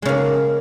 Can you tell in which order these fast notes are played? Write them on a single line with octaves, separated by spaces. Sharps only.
G#3 C#3 A#3